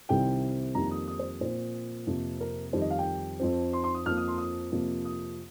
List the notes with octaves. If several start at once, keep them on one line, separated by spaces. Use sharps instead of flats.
C2 C3 D#3 G3 C4 G5
F2 D#3 G3 A#3 A#5
D#6
D#6
C5
A#2 F3 C4 C5
F2 C3 F3 A#3
A#4
F2 D#3 G3 C5
D#5
F5
G5
F2 F3 C4
C6
C6
D#6
F2 F3 A#3 F6
D#6
C6
D#6
F2 C3 F3 A#3
D#6